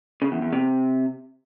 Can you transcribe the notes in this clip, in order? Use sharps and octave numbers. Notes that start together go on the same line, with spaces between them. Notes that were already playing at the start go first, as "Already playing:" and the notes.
C#3
E2
E2
C3